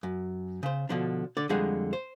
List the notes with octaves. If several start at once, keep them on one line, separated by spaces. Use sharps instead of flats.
F#2
C#3 C5
B2 D3 F3 D4
D3 D5
F2 D3 G3 G#3 G#4 F#5
C5